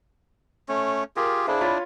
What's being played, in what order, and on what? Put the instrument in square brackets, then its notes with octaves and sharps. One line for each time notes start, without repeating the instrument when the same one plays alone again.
[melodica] A3 C#4
[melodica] F4 G4 G#4 [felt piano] A#4
[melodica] D4 E4 [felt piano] G#4 C5 F5
[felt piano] F4 C#5 B5